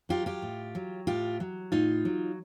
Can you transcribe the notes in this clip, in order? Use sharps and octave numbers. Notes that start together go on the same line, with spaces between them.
F#3 F4 G4
F4 G4
A2
F#3
A2 F4 G4
F#3
A2 D#4 F4
F#3